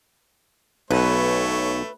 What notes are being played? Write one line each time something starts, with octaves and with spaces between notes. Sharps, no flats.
B1 A3 B4 C#5